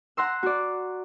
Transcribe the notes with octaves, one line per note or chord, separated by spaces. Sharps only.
F#5 A#5 C6 E6
F#4 D5